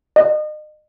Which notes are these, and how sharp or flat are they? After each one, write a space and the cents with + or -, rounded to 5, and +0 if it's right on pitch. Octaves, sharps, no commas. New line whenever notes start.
D#5 -35